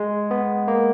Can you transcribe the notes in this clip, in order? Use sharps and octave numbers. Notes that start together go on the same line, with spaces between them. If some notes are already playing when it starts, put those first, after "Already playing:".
Already playing: G#3
B3
A#3